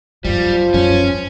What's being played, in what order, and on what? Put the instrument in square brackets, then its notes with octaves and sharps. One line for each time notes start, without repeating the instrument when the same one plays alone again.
[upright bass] F#2 C#3 [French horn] F3 [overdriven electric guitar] G3
[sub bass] F#2 [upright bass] G3 [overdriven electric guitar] C#4